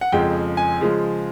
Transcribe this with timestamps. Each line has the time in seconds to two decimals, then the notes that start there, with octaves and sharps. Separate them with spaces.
0.01 F#5
0.12 F2 C#3 F3 G#3 G5
0.57 G#5
0.81 C#3 F3 G#3